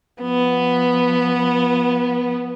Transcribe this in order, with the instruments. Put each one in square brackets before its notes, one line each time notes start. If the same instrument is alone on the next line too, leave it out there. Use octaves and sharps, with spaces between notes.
[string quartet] F3 B3